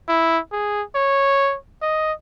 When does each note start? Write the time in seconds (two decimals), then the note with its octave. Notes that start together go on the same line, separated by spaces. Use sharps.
0.08 E4
0.52 G#4
0.95 C#5
1.82 D#5